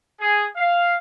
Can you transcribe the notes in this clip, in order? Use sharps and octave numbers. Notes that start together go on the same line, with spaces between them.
G#4
F5